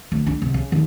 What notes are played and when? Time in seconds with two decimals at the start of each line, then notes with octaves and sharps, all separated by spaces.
0.12 D2
0.27 D4
0.42 C2
0.54 C#3
0.72 D#2